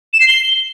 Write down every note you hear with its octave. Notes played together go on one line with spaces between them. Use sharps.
E7
C7
G7